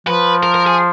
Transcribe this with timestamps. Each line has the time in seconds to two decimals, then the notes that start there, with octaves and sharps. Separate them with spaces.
0.07 F3 B4
0.43 A#4
0.54 A#4
0.66 G#4